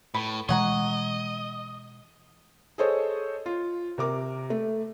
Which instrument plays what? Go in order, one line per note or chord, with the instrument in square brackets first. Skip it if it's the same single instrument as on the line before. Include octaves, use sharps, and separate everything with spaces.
[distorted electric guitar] A2 [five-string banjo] B4
[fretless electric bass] B2 E3 G#3 [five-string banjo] C#5 F#5 A#5 [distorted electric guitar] D#5
[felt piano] G#4 A4 C5 C#5 D#5
F4
C3 A#4 D6
A3